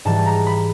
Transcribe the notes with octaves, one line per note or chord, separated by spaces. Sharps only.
G#2 E3 G3 A5
A#5
B5